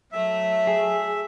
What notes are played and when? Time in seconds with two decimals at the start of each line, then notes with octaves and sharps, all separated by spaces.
0.12 F#3 A3 E5
0.67 G#4